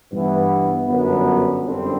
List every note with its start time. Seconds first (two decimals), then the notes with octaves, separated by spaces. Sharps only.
0.12 G2 E3 B3
0.87 G1 F#2 D3 F#3 B3
1.62 G1 F#2 D3 G3 C4